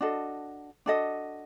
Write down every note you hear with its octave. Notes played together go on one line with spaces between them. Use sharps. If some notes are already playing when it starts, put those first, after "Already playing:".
D4 F#4 A4 D#5
D4 F#4 A4 D#5